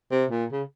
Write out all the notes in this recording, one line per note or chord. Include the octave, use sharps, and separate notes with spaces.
C3
A#2
C#3